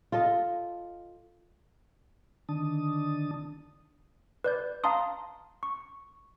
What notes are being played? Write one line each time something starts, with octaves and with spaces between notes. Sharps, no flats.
F4 A4 D#5
D3 D#3 D4 A5 D#6
B4 D5 G6
F5 A5 A#5 C6 D#6
C#6